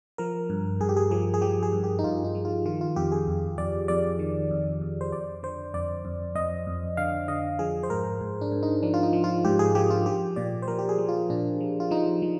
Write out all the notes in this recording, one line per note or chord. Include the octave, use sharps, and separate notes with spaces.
F3 A#4
G2
G2 G#4
G4
G#4
F3 G#4
G#4
F3 G4
G#4
G2
G4
D#4
G2 F4
D#4
F3
F4
D#3 F4
F4
F2 G4
G#4
F2
F2 D5
F2 D5
D#3
F2
F2
C5
F2 D5
D3 C5
F2 D5
F2
F2 D#5
F2
D3 F5
D3 D#5
F3 G#4
C5
G#2 A#4
G#2
D4
G#2
D#4
F3 D4
F4
D#4
F3
F4
G#2 G4
G#4
F3 G4
F4
F3 G4
A#2 D5
C5
F3 A#4
G4
G#4
F3
F4
A#2 D4
F3
F4
F3 D#4
F3